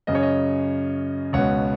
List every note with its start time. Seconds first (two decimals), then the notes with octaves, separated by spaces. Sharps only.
0.07 F#2 C#3 D#5
0.15 C#5
0.23 D#5
1.33 C#2 B2 C#5 F#5